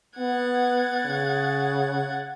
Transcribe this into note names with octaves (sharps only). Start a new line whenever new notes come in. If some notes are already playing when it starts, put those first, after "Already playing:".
B3 F#5 G#6 A6
C#3